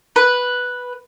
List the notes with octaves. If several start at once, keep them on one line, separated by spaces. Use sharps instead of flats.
B4